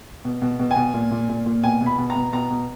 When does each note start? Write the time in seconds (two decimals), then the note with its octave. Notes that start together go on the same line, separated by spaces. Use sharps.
0.25 B2
0.42 B2
0.59 B2
0.71 G#5
0.76 B2
0.94 A#2
1.11 A#2
1.29 A#2
1.46 A#2
1.63 B2 G#5
1.81 B2
1.86 B5
1.98 B2
2.10 A#5
2.16 B2
2.33 B2 A#5
2.50 B2